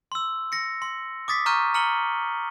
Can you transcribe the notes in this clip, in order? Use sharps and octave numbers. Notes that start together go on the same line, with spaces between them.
C6 E6
A#6 C#7
C6
D6 D#6 A6 B6
A#5 C#6 F6 G6 D#7
A#5 F6 C#7 D#7 F#7 G7